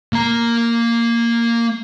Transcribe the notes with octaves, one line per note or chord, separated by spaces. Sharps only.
A#3 A#5